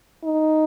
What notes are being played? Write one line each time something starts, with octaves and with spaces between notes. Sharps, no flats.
D#4